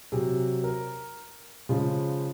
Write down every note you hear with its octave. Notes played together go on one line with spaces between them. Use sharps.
C3 F#3 G#4
A#4
C#3 F3 G#3